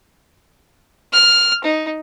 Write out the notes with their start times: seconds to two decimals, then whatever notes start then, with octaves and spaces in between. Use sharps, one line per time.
1.13 F6
1.64 D#4